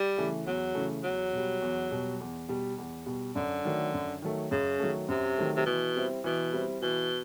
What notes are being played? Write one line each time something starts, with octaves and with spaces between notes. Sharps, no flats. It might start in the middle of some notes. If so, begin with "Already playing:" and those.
Already playing: G3
C#3 E3 A3
E2 F#3
C#3 E3 A3
E2 F#3
B2 G3
E2
B2 G3
E2
B2 G3
E2
B2 G3
F#2 D3
D#3 F#3 A3
F#2
D#3 F#3 A3
F#2 C#3
D#3 F#3 A3
F#2 C3
D#3 F#3 A3
C3
B2 E3
G3 C4 E4
B2 E3
G3 C4 E4
B2 E3